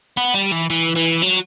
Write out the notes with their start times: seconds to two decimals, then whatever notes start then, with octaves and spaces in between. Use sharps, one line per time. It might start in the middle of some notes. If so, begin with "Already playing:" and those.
0.17 B3
0.34 G3
0.51 E3
0.70 E3
0.96 E3
1.23 F#3